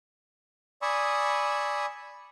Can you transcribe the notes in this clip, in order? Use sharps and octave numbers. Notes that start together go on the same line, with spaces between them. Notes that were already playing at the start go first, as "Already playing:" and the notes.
D5 G#5 B5 C#6 D#6 E6